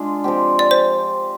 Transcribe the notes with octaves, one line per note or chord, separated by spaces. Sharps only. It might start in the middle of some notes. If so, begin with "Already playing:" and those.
Already playing: G#3 D4 F4
F3 C4 G4
D5
C5